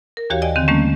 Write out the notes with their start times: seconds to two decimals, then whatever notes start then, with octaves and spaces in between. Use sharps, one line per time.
0.17 A#4
0.30 D#2 E3 F#4 G4 C#5 F5
0.42 D5 D#5 G5 G#5
0.56 D3 D#3 C4
0.68 D#3 G3 A3 A#3 C#4